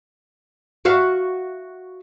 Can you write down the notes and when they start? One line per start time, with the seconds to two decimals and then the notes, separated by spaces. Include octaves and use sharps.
0.85 F#4 E5 F5